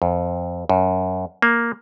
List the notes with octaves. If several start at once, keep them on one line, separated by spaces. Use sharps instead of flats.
F2
F#2
A#3